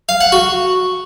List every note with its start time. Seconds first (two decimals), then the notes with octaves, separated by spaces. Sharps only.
0.09 F5
0.21 F#5
0.32 F#4